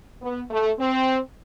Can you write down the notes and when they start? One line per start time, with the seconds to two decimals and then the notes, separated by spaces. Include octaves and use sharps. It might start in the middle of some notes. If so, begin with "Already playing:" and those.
0.21 B3
0.50 A3
0.79 C4